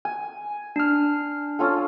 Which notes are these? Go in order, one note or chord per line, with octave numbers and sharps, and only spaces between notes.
G#5
D4 F6
C#4 F4 A4